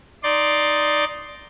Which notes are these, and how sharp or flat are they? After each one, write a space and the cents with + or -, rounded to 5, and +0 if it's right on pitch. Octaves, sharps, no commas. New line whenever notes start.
D#4 +0 D5 +0 C6 +0